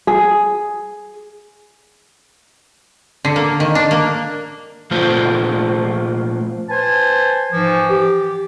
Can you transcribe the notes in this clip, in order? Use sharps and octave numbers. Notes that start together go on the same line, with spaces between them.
G#4
D3
A#3
D#3
D4
A#3
A#2 F3 A3 F4 A4 C5
B4 C5 G#5 A5
G#2 E3 F3
G4